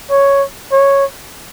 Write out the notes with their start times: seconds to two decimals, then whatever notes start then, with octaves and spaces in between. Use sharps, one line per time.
0.10 C#5
0.72 C#5